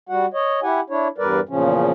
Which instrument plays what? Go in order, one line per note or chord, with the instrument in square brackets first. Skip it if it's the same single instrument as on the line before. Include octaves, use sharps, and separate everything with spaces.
[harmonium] G3 F#4 F#5
C#5 D#5
E4 G4 F#5 G#5
D4 E4 C#5
E2 G2 G3 A#4 B4 D5
E2 A#2 C#3 F3 C#4